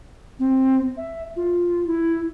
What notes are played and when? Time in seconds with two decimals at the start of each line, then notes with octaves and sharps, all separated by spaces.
0.39 C4
0.97 E5
1.36 F4
1.87 E4